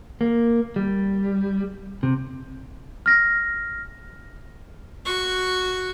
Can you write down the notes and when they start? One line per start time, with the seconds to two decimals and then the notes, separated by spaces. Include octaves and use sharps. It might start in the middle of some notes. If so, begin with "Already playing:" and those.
0.21 A#3
0.76 G3
2.03 C3
3.06 F6 A#6
5.05 F#4 C#6